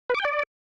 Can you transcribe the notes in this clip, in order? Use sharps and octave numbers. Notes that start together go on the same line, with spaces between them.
B4
D6
G5
D5